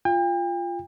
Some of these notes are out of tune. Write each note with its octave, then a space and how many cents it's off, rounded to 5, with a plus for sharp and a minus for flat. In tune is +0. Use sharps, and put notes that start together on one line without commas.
F4 -10 G5 +40